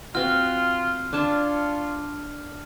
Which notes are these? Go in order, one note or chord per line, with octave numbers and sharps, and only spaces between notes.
C4 F4 F#4 F6
D4 F4 C#5 A5